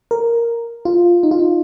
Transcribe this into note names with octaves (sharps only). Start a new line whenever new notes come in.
A#4
F4
D#4
F4
D#4